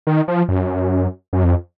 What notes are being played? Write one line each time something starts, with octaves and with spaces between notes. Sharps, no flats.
D#3
F3
F#2
F#2
F2